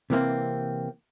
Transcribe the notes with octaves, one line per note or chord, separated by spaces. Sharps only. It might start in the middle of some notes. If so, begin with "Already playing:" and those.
C3 E3 A#3 C4